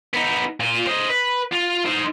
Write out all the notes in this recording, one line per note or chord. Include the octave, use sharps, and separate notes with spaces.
B3 D#4
A#2 F4
C5 D#5
B4
F4
D#4 C5